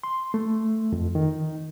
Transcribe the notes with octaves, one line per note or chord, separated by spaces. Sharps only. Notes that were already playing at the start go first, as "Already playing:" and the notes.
C6
A3
F2
D#3